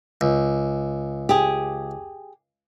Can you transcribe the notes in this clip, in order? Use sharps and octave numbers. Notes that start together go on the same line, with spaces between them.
C#2
G4 G#4